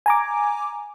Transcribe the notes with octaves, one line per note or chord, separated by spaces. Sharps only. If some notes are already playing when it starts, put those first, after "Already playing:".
G#5 A#5 D6